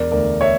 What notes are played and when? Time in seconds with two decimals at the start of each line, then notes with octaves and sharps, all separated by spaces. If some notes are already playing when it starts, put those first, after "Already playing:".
Already playing: E1 A#4 D5
0.11 D2 A#4 D5
0.41 C#5 E5